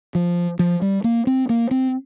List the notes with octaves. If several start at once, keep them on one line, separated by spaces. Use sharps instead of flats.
F3
F3
G3
A#3
C4
A#3
C4